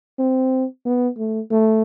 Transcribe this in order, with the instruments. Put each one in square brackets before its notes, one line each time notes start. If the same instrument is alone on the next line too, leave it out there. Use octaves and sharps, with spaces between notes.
[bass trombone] C4
B3
A3
A3